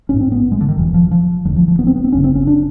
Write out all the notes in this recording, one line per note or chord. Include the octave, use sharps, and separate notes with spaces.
A1 G#2 C#4
C4
B3
G#3
D3
D#3
F1 E2 B2 E3
F3
F3
E1 D2 D3 F#3
F3
F3
B3
C4
B3
C4
G1 F#2 C#3 C#4
C4
C#4
D4